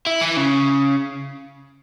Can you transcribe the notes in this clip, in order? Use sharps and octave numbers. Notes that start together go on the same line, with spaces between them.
E4
E3
C#3